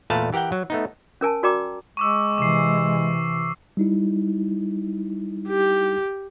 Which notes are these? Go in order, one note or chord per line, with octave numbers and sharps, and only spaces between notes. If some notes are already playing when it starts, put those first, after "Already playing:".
E2 A#2 A3 B4 F5 A5
E3 G4 A#4 F#5 G5
F#3
A3 B3 D#4
C#4 A#4 G#5 A5
F#4 A#4 D5 G5 A#5 D6
G#3 C#6 D6 E6
C3 E3 D6 C7
G3 D#4 E4
G4